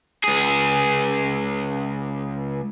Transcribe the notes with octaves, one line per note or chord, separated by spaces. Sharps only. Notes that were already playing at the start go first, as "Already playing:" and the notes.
C#2 G#4